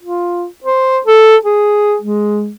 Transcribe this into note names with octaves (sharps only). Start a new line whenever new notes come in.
F4
C5
A4
G#4
G#3